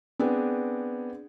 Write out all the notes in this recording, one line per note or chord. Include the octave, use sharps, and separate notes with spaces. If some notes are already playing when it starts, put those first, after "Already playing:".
B3 C4 D4 G#4